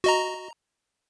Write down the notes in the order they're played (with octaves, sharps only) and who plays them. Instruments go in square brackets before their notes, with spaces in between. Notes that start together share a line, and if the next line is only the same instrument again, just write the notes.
[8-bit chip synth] F#4 D#5 A#5